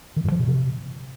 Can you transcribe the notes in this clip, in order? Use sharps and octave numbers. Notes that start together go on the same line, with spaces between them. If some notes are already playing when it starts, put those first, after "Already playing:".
D#3
G2
F3
B2
C3